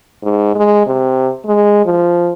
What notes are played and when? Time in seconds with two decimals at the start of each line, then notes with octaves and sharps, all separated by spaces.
0.23 G#2
0.56 G#3
0.87 C3
1.45 G#3
1.86 F3